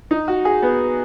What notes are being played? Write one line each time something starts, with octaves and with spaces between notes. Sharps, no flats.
D#4
F#4
G#4
B3